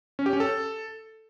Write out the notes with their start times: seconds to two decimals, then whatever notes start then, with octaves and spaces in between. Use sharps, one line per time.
0.19 C#4
0.26 G4
0.33 C#4
0.40 A4